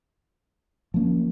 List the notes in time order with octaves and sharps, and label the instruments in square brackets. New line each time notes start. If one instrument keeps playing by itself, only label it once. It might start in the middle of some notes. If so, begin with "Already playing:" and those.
[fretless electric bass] F3 A#3 C#4